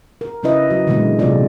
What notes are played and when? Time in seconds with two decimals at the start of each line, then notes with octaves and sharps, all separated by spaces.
0.21 A#4
0.43 C#3 C#4 E4 B4 D#5 E5
0.70 F#3 F#4
0.87 A#2 D3 E3 F#3 G#3 B3
1.19 C3 F#3 B3 F4 G#4 D5